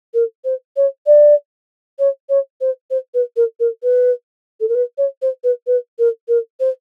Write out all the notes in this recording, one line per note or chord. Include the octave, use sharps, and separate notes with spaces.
A#4
C5
C#5
D5
C#5
C#5
C5
C5
B4
A#4
A#4
B4
A4
A#4
B4
C#5
C5
B4
B4
A#4
A#4
C5